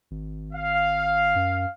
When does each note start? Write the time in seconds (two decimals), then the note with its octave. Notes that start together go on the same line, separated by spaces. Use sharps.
0.11 G#1
0.53 F5
1.36 F#2